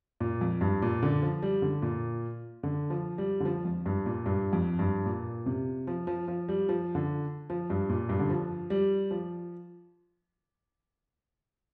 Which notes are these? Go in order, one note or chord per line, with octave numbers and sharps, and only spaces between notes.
A#2
F2
G2
A#2
D3
F3
G3
D3
A#2
D3
F3
G3
D3
F3
F2
G2
A#2
G2
F2
G2
A#2
C3
F3
F3
F3
G3
F3
D3
F3
G2
A#2
G2
D3
F3
G3
F3